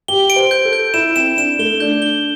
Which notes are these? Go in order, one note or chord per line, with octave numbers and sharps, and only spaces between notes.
G4 G7
D7
C5
G6
A4
G6
E4 E7
C4 E7
D4 E7
A3 G7
D4 G6
G7